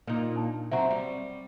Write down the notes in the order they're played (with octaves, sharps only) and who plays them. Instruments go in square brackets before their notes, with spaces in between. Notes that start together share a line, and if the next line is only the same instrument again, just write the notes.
[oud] A#2 D#4
[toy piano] D4 A5
[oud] F#3 C4 F#4 [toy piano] E5 A#5
[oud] G3